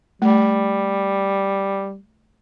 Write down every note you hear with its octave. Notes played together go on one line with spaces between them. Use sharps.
G3 A3